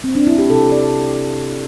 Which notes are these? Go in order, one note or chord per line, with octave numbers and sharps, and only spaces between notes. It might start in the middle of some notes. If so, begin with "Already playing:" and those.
C4
D4
E4
G4
C3 A4
D5